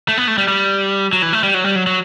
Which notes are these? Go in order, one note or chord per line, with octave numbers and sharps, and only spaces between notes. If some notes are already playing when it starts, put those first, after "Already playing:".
A3
B3
A3
G3
G3
F#3
E3
A3
G3
F#3
G3
F#3
F#3